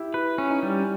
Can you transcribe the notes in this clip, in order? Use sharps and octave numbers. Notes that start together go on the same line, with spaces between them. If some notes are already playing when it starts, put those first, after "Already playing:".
Already playing: E4 G4
E4 B4
C#4
D#4
G3